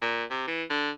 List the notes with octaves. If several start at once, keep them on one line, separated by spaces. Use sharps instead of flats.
A#2
C3
E3
D3